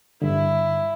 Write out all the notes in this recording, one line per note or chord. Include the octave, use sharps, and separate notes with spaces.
G2 D3 E4